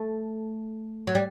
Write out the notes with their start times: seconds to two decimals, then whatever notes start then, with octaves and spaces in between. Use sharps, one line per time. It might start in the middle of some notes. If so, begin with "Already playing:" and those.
Already playing: A3
1.07 F#3
1.15 G3